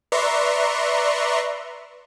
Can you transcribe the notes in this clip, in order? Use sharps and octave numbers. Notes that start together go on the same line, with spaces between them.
B4 D5 E5 A#5 C6 C#6